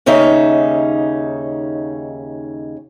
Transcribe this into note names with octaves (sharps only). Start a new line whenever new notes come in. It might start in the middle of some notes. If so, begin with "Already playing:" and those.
D#2 C#3 C#4 D#4 E5